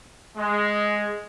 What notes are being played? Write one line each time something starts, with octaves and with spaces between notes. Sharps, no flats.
G#3